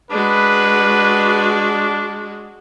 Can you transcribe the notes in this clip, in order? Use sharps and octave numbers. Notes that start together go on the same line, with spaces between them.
G#3 D4 F#4 B4